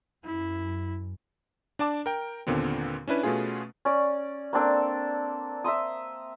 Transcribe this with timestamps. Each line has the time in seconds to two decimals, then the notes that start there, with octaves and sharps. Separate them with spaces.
0.24 F#2 E4
1.79 D4 D5 A5 D6
2.06 A#4 G5
2.47 D#2 A#2 D3 B3 C4
3.08 C#4 D4 E4 B4
3.23 B2 A3 B3 C#4 F4 G#4
3.85 C#4 D5
4.53 A#3 C4 D4 A4
5.64 E5 A#5 C6 D#6